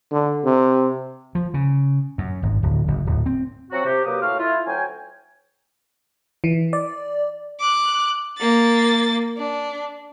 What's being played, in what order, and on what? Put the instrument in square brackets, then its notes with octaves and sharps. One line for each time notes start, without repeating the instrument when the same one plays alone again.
[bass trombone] D3
C3
[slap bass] F3
C#3
F#2
G#1
D1
F#1
D1
C4
[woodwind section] F3 F#3 C4 F#4
C3 G4
F#3 A#3 G4 B4 D6 D#6
A2 F#4 F5
E4 F4
D2 F#3 G5 G#5
[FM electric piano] E3
D5
[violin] D6 F#6
A#3 A6
D4